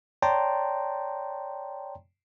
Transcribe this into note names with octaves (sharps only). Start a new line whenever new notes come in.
C#5 D5 G5 A5 A#5 C6